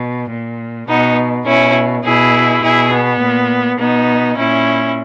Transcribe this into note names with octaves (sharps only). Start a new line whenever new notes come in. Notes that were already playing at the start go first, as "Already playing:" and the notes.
Already playing: B2
A#2
B2 B3 D#4
B2 C#4 E4
B2 E4 G#4
B2 E4 G#4
B3
A#2
B2 B3 D#4
A#2 C#4 E4